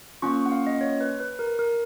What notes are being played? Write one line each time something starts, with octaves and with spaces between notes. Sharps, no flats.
A#3 C#4 F4 C#6
C#6
F#5
F5
D#5
C#5
B4
B4
A#4
A#4